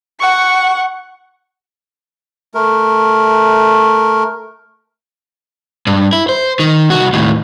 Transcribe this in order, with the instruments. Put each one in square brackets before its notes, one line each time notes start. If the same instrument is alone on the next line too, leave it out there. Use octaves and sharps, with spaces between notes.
[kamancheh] F#5 C#6
[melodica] A3 A#4
[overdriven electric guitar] G2
E4
C5
D#3
C2 F#4
D#2 A2